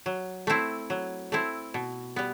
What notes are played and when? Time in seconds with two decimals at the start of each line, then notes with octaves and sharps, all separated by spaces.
0.06 F#3
0.47 A3 C4 E4
0.90 F#3
1.32 A3 C4 E4
1.74 B2
2.16 G3 B3